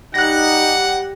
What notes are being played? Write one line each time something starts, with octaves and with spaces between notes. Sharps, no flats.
G3 D#4 F#5 F#6 A#6